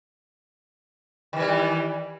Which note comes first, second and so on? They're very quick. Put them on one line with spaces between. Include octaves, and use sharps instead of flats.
D#3 E3 G3